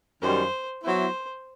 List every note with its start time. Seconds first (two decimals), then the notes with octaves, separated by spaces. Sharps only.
0.21 F#2 D#3 G3 C5
0.84 F#3 B3 E4 C5